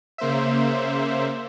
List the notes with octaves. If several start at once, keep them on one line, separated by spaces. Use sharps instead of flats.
C#3 A#3 C5 E5